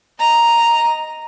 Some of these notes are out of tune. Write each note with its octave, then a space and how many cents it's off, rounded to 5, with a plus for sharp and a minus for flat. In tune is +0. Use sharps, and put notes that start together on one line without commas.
D#5 +0 A#5 +0